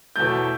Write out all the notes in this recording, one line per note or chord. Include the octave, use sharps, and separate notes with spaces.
E2 B2 F#3 A3 G6